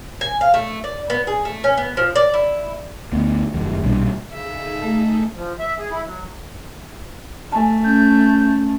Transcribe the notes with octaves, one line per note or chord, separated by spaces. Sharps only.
G#5
F5
A3
D5
B3
G#4
A3
C#4
B3
F3
D5
E4
D2 B3
F1 F#2 D#3
B1 A#2 G3 D4
C#3 D#4 G#4 A4 E5
A3
F3
E5
G#4
E4
F#3
A3 G#5 A5
C#4 G6